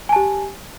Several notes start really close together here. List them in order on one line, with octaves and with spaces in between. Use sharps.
G#5 A5 G4